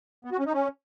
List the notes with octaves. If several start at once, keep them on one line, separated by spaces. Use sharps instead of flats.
B3
F#4
C#4
D#4
C#4